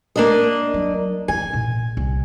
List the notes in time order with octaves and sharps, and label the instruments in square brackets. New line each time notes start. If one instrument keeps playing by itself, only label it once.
[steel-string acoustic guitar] A#3 D4 D#5
[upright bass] F#3
[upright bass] E3 [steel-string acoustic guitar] G#5
[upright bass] A#1
C2